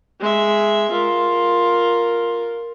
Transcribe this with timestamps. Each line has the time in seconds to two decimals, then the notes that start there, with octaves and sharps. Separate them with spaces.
0.20 G#3 E5
0.91 F4 A#4